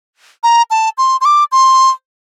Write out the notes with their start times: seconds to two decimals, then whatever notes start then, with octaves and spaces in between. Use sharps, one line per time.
0.43 A#5
0.71 A5
0.98 C6
1.21 C6
1.25 D6
1.52 C6